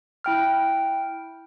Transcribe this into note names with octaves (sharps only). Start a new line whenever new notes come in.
E4 G5 F6